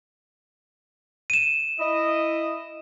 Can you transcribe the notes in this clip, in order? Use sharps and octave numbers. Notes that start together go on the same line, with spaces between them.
D#7 E7
E4 D#5